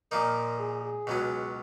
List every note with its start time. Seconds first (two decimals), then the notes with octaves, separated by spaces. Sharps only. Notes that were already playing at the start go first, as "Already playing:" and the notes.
0.11 A#2 F3 A#3 D#4 A#4
0.59 G#4
0.83 G#4
1.07 C#2 B2 F#3 C#4